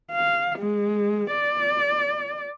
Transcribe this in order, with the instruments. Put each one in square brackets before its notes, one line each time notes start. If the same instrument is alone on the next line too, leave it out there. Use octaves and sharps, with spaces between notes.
[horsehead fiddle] F5
G#3
D5